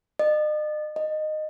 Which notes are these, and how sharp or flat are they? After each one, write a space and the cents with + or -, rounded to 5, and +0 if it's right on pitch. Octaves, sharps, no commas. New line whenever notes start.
D#5 -45
D#5 -10